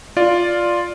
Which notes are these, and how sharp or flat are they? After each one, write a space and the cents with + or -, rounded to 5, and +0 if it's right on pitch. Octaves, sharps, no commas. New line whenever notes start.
F4 +0 D5 +0